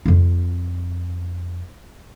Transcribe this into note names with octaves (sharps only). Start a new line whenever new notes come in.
F2 F4